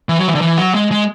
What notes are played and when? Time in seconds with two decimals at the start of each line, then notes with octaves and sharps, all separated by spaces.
0.09 E3
0.19 F#3
0.28 E3
0.35 D3
0.41 E3
0.58 F#3
0.75 G#3
0.91 G#3